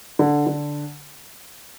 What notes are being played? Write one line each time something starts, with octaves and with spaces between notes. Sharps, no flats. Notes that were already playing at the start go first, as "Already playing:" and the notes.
D3
D3